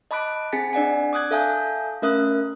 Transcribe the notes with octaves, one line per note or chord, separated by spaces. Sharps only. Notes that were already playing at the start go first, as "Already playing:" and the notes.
D#5 A5 B5 D6 F#6 D7
C4 G#4 G#5 A6 B6 C#7
D4 D5 F#5 G#5
D6 D#6 F#6 G#6
A4 E5 F5 G#5 A5 G6
A3 C#4 A#4 E5 D#6 F#6